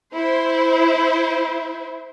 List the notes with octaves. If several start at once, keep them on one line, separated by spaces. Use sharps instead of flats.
E4 C5